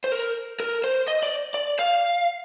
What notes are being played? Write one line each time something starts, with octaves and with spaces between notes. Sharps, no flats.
C5
A#4
A#4
C5
D#5
D5
D5
F5